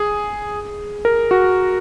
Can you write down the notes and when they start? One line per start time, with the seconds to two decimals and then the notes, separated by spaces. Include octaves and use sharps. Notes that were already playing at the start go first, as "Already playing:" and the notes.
Already playing: G#4
1.05 A#4
1.31 F#4